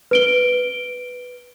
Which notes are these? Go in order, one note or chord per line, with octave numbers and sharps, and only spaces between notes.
B4 D7 G7